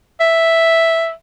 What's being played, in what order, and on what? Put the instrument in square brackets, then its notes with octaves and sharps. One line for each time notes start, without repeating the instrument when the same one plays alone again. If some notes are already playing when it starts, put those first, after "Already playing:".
[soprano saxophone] E5